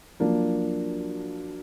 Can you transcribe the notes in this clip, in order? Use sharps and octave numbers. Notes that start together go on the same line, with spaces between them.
F3 F#3 A#3 D4